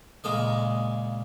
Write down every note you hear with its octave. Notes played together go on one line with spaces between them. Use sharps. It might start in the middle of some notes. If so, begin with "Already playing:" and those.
A#2 C#3 G#3 D#5